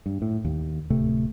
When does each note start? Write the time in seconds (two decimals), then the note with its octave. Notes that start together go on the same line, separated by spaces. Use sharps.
0.06 G2
0.22 A2
0.45 D#2
0.90 D1 C3 A3